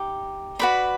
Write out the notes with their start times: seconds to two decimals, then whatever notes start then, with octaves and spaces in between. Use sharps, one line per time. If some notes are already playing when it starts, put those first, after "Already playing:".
Already playing: D#4 G4
0.59 F#4 B4 D5 B5